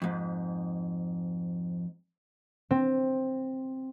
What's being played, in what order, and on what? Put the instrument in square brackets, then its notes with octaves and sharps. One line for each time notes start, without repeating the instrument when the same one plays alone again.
[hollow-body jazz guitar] F2 G#2
[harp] C4